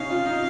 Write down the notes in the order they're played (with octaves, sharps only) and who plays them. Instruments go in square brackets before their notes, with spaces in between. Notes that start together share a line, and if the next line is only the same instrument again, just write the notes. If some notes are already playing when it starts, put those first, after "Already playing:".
Already playing: [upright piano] C#4 D#4 [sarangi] F5
[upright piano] F4
D#4